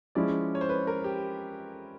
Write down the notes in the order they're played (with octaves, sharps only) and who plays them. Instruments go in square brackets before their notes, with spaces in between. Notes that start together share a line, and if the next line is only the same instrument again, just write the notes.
[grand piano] F3 G#3 C#4 E4 [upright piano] D5
[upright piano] C#5
C5
B4
A#4
G4